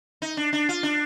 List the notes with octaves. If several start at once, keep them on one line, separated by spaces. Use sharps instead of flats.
D#4
D4
D4
F4
D4